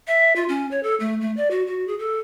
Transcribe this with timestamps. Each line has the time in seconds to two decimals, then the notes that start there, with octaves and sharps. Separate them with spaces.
0.07 E5
0.36 F4
0.49 C#4
0.71 C#5
0.83 A4
1.00 A3
1.21 A3
1.37 D5
1.51 F#4
1.67 F#4
1.87 G#4
1.99 A4